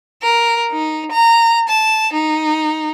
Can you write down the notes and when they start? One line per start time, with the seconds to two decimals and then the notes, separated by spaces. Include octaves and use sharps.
0.22 A#4
0.72 D#4
1.12 A#5
1.68 A5
2.13 D#4